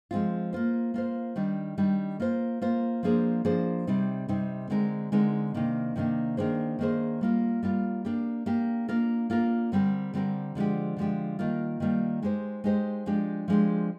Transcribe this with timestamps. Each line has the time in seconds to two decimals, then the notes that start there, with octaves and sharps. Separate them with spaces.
0.11 F3 G#3 C4 F4
0.53 A#3 F4 C5
0.94 A#3 F4 C5
1.36 D#3 G3 D4
1.78 D#3 G3 D4
2.20 A#3 F4 C5
2.62 A#3 F4 C5
3.03 F3 A#3 D4 G#4 C5
3.45 F3 A#3 D4 G#4 C5
3.87 C3 G3 C4 D#4
4.29 C3 G3 C4 D#4
4.70 D3 G#3 C4 D#4 A#4
5.12 D3 G#3 C4 D#4 A#4
5.54 C3 D#3 A#3 D4
5.96 C3 D#3 A#3 D4
6.37 D#3 A#3 D4 G#4 C5
6.79 D#3 A#3 D4 G#4 C5
7.21 G3 A#3 F4
7.63 G3 A#3 F4
8.05 A#3 D4 G4
8.46 A#3 D4 G4
8.88 A#3 D4 F4 A#4
9.30 A#3 D4 F4 A#4
9.72 D3 G3 C4 G4 A#4
10.14 D3 G3 C4 G4 A#4
10.55 D3 F3 G#3 D4 G4
10.97 D3 F3 G#3 D4 G4
11.39 D#3 G3 A#3 F4
11.80 D#3 G3 A#3 F4
12.22 G#3 D#4 G4 C5
12.64 G#3 D#4 G4 C5
13.06 F3 G#3 D4 G4
13.48 F3 G#3 D4 G4